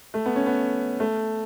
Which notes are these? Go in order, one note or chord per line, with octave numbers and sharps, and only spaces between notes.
A3
B3
C#4
B3
A3